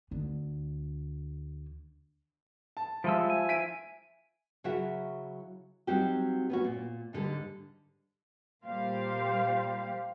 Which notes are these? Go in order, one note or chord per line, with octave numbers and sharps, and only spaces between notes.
D2 D3
A5
F3 G3 G#3 E5 E6
G#5
B6 D7 D#7
C#3 F#3 E4 F#4 E5 F#5
F#3 G3 C4 D#4 F#4 G4
B3 C#4 F#4
A#2
G#2 D3 G3 A4
A#2 G3 A#3 G4 C5 F5